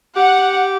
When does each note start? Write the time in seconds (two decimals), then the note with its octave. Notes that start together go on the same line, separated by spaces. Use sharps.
0.16 G4 F#5